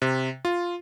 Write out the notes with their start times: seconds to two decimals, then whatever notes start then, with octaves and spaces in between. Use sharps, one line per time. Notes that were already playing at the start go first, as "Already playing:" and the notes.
0.02 C3
0.45 F4